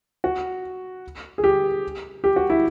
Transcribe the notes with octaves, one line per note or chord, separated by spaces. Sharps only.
F#4
G#4
G4
G4
F#4
E4